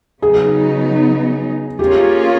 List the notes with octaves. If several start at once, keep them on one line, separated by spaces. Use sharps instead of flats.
C#3 F#3 B3 D#4 G#4
A#3 C#4 F4 G4 G#4